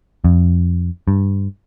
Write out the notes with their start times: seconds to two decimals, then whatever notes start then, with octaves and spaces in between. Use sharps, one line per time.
0.24 F2
1.08 G2